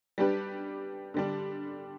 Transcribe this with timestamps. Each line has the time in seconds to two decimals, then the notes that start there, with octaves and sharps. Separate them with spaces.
0.18 G3 D4 G4 B4
1.14 D3 G3 D4